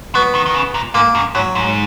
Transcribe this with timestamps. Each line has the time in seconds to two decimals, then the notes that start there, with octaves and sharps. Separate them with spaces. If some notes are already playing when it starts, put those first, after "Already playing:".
0.15 F#3 B3
0.35 D#3
0.46 D#3
0.54 C#3
0.74 A#2
0.94 G#2 A#3
1.15 F#2
1.35 G#2 F#3
1.55 G#2